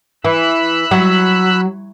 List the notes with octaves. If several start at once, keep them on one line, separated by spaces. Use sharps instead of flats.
E3 B5 E6 F#6
F#3